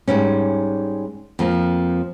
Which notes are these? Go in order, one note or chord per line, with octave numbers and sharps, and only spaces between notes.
G#2 G3 C#4
F2 F3 A#3